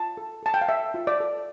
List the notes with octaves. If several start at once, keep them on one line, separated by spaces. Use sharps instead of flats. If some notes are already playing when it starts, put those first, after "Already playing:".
Already playing: F4 A5
A4
A4 A5
G5
F5
A4 E5
F4
D5
A4